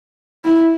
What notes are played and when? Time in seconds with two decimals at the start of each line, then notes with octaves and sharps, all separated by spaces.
0.45 E4